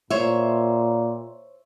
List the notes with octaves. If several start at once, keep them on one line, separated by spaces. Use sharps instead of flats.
A#2 C5 C#5 E5